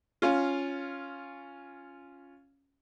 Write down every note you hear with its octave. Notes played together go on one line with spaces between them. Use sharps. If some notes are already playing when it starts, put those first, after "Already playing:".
C#4 F4